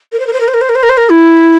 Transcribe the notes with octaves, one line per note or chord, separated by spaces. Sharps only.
A#4
C5
A#4
C5
A#4
C5
A#4
C5
A#4
C5
A#4
C5
A#4
E4